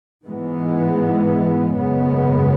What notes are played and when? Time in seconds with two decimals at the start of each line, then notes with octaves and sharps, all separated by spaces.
0.24 G#2 E3 G#3 B3
1.73 G#1 F#2 C#3 G#3 B3